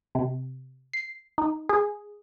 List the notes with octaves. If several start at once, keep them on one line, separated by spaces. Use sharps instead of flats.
C3
C7
D#4
G#4